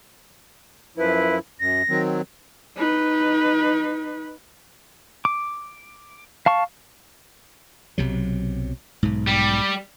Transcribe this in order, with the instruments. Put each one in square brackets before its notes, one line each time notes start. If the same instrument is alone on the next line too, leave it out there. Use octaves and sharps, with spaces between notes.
[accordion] F#2 F3 E4 [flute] B4
[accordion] F#2 [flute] A#6
[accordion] D#3 F#3 C4
[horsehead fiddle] D#4 B4
[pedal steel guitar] D6
F5 A5 C#6
[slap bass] B1 C3 F#3
B1 G#2
[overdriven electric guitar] G3